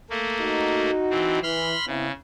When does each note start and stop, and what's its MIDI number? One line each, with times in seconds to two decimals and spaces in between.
0.10 0.91 57
0.10 0.91 58
0.40 1.43 63
0.40 1.43 66
1.10 1.39 52
1.10 1.39 60
1.43 1.74 52
1.43 1.85 83
1.43 1.85 84
1.43 1.85 89
1.87 2.12 49
1.87 2.08 59
1.87 2.08 60
1.87 2.08 64